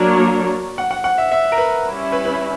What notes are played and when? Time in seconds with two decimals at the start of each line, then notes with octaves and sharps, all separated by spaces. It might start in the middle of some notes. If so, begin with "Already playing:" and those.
Already playing: F#3 A#3 D4 A#4 C#5 D5
0.78 F#5
0.91 F#5
1.04 F#5
1.18 E5
1.32 E5
1.52 A#4
1.58 B4
1.86 G3 C#4 E4
2.12 B4
2.25 B4